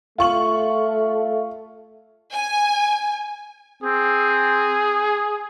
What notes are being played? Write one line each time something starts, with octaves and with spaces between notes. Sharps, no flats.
A3 F4 C#6 F#7
G#5
C4 G#4